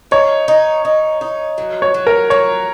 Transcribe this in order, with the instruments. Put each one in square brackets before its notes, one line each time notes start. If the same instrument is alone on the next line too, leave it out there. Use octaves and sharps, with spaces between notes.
[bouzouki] D#4 [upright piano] C#5
[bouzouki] D#4
D#4
D#4
F#3
[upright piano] C#5
[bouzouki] F#3
[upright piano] A#4
[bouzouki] F#3 [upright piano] C#5